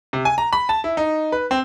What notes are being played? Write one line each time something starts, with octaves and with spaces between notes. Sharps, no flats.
C3
G#5
A#5
B5
A5
E4
D#4
B4
C4